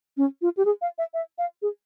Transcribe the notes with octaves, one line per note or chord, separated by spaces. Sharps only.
C#4
F4
G4
G#4
F5
E5
E5
F5
G#4